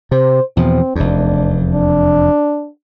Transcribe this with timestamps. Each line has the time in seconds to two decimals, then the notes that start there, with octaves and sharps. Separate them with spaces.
0.11 C3 C5
0.57 E2 B2 F3 C4
0.96 F1 E2 D4
1.71 D4